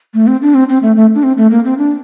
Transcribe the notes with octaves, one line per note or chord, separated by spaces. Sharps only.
A3
C4
D4
C4
C4
A3
A3
D4
C4
A3
A#3
C4
D4